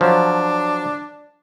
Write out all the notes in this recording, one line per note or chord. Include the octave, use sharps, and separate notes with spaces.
F3 F#3 D4